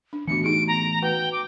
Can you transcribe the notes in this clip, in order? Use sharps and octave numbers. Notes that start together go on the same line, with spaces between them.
D4
E3 A3 B3 D4 F#4 C#7
D#4 G4 G#4 D7
B3 A#5
F#4 B4 F#5 G5
D6